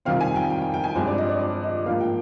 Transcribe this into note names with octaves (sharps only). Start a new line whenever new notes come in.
F2 C3 D#3 G3 C4 F5
G#5
G5
G5
G5
G5
G#5
G2 F3 G#3 C4 C5
D5
D#5
D5
D5
D#5
G#2 F3 A#3 F5
G5